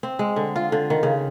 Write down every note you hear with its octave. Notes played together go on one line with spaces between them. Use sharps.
C4
G#3
D3
F4
D3
D#3
C#3